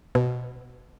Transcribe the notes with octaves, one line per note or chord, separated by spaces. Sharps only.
B2